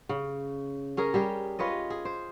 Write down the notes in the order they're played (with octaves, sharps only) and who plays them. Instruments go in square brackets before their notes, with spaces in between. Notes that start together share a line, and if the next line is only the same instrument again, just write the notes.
[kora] C#3
C#4 G#4 A#4
G3 G4 G#4
F4 B4 C#5 D#5
G#4
C5